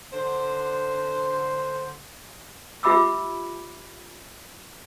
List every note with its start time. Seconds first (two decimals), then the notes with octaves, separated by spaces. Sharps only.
0.12 D3 C5
2.83 F4 G4 E5 B5 D6 E6